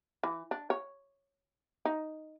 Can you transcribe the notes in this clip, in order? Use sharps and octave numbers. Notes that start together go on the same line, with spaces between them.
E3
D4
C#5
D#4